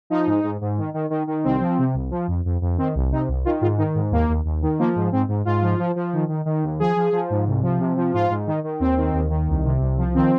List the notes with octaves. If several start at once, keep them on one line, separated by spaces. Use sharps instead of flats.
F3 D#4
G#2
G#2
G#2
D#3
D#3
D#3
D#3
C2 C4
F3
C3
C2
F3
F2
F2
F2
D#3 C4
C2
C3 D#4
C2
D#3 F4
G#2 F4
D#3 D#4
G#2
D#2 A#3
D#2
D#2
D#3
F3 A#3
G#2
G#2 C4
G#2
G#2 F4
F3
F3
F3
D#3
D#3
D#3
D#2
F3 G#4
F3
F3
G#2
C2
F3
C3
F3
G#2 F4
G#2
D#3
D#3
D#2 C4
D#3
D#2
D#3
C2
C3
C2
F3
D#3 C4